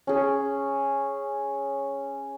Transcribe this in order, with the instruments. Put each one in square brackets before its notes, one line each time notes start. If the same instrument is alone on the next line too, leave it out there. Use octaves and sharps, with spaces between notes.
[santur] C#4 G#4